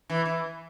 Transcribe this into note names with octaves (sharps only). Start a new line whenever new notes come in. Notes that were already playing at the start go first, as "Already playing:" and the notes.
E3
E3